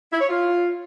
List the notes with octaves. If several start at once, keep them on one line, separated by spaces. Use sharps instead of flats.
E4
C#5
F4